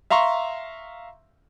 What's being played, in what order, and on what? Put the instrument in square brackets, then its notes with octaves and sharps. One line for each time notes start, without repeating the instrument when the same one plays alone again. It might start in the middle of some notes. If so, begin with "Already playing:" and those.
[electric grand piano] E5 F5 A#5 C6 C#6